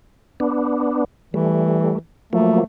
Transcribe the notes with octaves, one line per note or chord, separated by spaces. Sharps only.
B3 D4
E3 G3 A3
F3 F#3 A3 A#3